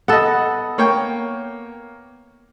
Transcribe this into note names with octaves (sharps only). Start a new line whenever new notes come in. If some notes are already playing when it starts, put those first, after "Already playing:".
B3 A4 D#5 F#5
A#3 C#5 G5